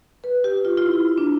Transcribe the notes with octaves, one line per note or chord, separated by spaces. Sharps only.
B4
G4
F4
F4
E4
D4